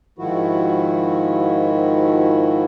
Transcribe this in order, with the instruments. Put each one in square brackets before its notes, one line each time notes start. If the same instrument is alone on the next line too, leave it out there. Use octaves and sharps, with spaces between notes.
[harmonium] G#2 D#3 F3 E4 F#4